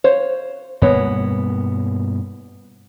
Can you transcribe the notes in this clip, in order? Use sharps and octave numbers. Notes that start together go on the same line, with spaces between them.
C5 C#5 F5
G2 B2 G#3 A#3 B3 C#5